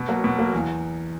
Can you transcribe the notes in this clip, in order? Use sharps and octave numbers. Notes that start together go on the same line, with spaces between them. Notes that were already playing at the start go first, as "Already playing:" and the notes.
Already playing: B2
F#3 A#3
B2
F#3 A#3
E2